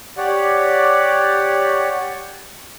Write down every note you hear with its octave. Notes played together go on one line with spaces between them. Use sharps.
G4 C#5 D5 F#5